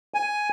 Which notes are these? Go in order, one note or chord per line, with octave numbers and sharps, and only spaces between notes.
G#5